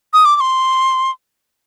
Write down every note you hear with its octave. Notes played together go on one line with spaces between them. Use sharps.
D#6
D6
D6
C6